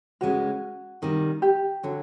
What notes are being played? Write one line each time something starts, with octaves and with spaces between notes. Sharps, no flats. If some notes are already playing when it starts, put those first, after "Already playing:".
D2 C#3 E3 G#3 C#4 F#4
C3 D#3 G3
G4
D3 F#3